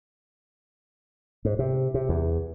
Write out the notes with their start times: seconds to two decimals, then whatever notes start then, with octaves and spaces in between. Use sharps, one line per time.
1.45 G#2
1.59 C3
1.94 C3
2.09 E2